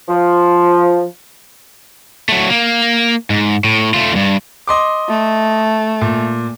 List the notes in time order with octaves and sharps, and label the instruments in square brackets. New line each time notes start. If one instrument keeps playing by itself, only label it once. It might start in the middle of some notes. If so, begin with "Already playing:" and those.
[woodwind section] F3
[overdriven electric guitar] F#3 A3
A#3
G#2
A2
A3 F4
E2 G2
[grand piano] D#5 C6 D6
[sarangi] A3
[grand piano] A#2